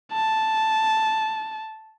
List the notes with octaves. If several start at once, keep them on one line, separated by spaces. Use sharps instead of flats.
A5